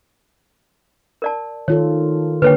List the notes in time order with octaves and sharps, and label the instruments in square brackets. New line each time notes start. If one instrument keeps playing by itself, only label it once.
[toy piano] A#4 D5 A5
[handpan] D#3 F4 A4 [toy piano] C#5
[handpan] D3 A#3 [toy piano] B4 C#5 G5